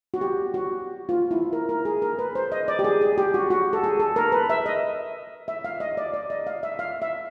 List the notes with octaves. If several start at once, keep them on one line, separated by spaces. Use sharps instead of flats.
F#4
G4
F#4
F4
E4
A#4
A#4
G#4
A#4
B4
C5
D#5
D5
G4
G#4
G#4
G4
F#4
F#4
A4
G#4
A4
A#4
B4
E5
D#5
E5
F5
D#5
D5
D5
D#5
F5
E5
F5
E5